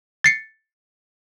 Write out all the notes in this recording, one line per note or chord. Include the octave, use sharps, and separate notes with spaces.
A6 C7 C#7